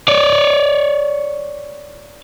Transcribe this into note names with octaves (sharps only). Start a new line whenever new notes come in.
C#5 D5